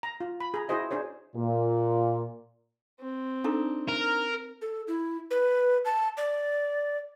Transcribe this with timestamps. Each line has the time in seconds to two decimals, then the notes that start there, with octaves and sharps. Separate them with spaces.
0.03 A#5
0.20 F4
0.40 B5
0.54 G#4 A#5
0.68 E4 F#4 G#4 C5 D#5 E5
0.91 D4 G#4 C5 C#5
1.35 A#2
3.00 C4
3.44 D4 D#4 A4
3.88 A#4
4.62 A4
4.88 E4
5.31 B4
5.85 A5
6.17 D5